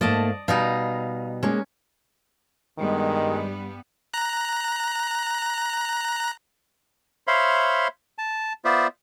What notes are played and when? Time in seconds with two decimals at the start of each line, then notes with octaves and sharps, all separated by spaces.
0.01 G#2 A3 A#3 D5 D#5 A5
0.48 B2 G3 D#4 F5
1.43 G#3 A#3 C#4 G#4
2.78 G2 D#3 G3 G#3 B3
4.14 A#5 F#6
7.27 C5 C#5 E5 F5 B5 C6
8.18 A5
8.65 B3 F4 C5 D5 E5